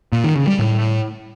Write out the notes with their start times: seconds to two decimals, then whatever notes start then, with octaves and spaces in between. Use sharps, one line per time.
0.12 A#2
0.24 D#3
0.36 C#3
0.47 G3
0.59 A2